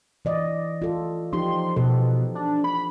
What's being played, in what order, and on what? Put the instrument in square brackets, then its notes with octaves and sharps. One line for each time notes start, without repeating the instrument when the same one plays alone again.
[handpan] E3 D5 D#5
F4 A4
[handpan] F3 D#4 G4 [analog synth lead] C6
[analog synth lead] B2 [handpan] A4
[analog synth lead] D4
B5